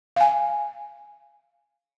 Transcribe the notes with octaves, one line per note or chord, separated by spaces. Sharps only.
F5 G#5